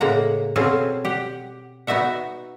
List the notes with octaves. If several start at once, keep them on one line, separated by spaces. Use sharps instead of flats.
A2 C#3 G#3 A#3 F#5 A#5
B2 C4 C#4 F4 G#4 A4
G4 F#5
B3 D#4 F#4 E5 F#5